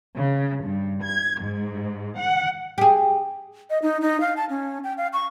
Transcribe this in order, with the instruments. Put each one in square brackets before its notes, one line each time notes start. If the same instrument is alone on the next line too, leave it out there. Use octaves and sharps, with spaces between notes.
[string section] C#3
G2
G#6
G#2
F#5
[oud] G4 G#4
[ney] D#5
D#4
D#4
F5
A5
C#4
G5
F5
C#6